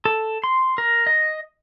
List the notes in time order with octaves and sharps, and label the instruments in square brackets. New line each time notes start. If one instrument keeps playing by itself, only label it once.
[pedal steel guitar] A4
C6
A#4
D#5